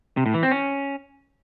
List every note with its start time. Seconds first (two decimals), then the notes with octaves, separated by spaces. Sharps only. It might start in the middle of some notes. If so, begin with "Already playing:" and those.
0.17 C3
0.26 A2
0.34 E3
0.43 C4
0.51 C#4